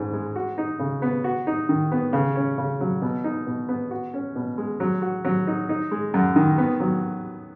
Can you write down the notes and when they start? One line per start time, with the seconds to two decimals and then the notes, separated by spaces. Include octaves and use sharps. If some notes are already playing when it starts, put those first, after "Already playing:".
Already playing: G#2 C#4
0.13 G#3
0.36 F#4
0.58 D#4
0.79 C#3
1.02 B3
1.24 F#4
1.47 D#4
1.69 D#3
1.92 B3
2.13 C#3
2.36 C#4
2.58 C#3
2.80 F#3
3.02 B2
3.24 D#4
3.47 B2
3.69 B3
3.91 F#4
4.14 C#4
4.35 B2
4.58 G#3
4.80 F#3
5.02 F#4
5.25 F#3
5.47 D#4
5.69 D#4
5.91 G#3
6.14 F#2
6.36 D#3
6.58 B3
6.80 F#3